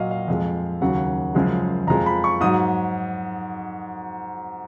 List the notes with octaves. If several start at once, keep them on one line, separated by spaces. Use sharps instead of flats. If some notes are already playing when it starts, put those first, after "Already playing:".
Already playing: A#2 F#3 D#5 F5
F5
F2 F3 G#3
D#2 C#3 F#3 F#5
F#2 C#3 F3 G#3
F2 F3 G#3 A#5
B5
C#6
G#2 F#3 D#6